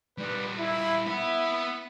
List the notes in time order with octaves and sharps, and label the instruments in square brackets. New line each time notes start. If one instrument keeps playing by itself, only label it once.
[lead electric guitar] G3 D#4 [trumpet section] B4 D5
[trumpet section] E4
[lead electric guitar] B3 B5 [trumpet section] E4 E5